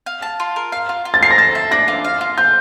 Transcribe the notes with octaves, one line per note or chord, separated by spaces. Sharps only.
F5
A5
F4
A#4
F5
F4
F4
A6
A#4 C7
A#6
A4 A6
E5
D4 A#6
F4
F5
F4
F4 G6